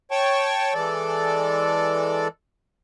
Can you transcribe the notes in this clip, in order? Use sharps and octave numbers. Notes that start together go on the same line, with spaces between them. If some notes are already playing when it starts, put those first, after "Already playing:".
C#5 G5 A5 C#6
E3 G#3 A4 D5